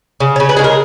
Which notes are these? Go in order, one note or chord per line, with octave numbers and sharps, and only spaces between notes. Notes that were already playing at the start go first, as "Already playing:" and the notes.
C#3
C#3 C#5
B4
G#3 G#4
A#4